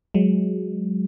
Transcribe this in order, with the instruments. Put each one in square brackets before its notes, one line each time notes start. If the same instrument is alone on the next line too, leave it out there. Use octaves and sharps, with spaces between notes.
[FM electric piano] F#3 G#3